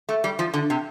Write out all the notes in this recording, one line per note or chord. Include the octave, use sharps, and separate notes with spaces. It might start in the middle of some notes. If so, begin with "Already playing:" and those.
A3
G3
F3
D3
C3